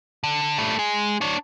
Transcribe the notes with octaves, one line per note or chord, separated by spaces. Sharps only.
D3
G3 A3
G#3 G#4
D4 C#5